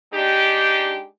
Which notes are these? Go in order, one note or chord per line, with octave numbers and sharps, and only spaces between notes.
G#3 D4 D#4 G4